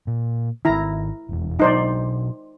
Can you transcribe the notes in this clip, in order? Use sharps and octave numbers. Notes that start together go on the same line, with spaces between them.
A#2
G#1 D#3 E4 A#5
F1 E2
B2 F#3 D4 D#4 C5 D5